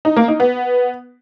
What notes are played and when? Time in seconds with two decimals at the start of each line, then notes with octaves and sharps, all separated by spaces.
0.05 D#4
0.17 A#3
0.28 D#4
0.40 B3